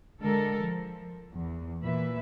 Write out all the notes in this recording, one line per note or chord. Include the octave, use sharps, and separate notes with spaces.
D3 G#3 A4 A#4
F3
E2
A#2 E3 B4 E5